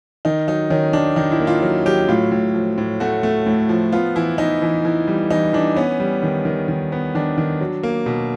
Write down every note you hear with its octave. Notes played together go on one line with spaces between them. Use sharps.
D#3 D#4
F#3 D#4
D#3 C#4
D#3 D4
D#3 D#4
E4
A#3
F4
F#3
F#3 G4
A2 F4
A2
F3
A2
A3 F#4
A3
A2
F3
B3 F4
E3 E4
E3 D#4
E3
E3
G3
E3 D#4
E3 D4
B3 C#4
G3
D#3
D#3
D#3
B3
D#3 D4
D#3
F#3
A#3
B2